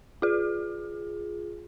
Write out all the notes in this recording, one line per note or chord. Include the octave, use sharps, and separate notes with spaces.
F4 G#4